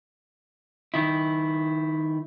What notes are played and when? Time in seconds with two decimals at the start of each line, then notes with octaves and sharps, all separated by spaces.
0.94 D#3 E4